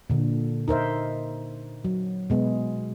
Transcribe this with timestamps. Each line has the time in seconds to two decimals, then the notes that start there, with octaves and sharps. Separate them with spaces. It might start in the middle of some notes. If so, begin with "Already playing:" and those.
0.10 A#2 D3
0.68 D#4 A#4 C5 E5
1.85 F#3
2.30 B2 G#3 B3